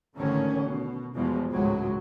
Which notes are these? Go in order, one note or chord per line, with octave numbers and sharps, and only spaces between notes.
A1 G#2 D3 D#3 C#4
B2
E2 B2 F3 G3 G#3
G#1 C#2 A2 F#3 G#3